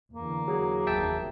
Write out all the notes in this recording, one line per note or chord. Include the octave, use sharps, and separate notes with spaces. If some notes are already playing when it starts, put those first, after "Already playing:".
E2 D3 A#3
F#3 G#4
F1 D#2 F#3 E5 G5 A5